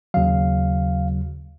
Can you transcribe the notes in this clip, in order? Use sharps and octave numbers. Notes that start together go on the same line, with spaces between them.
D#2 C#3 F#3 F5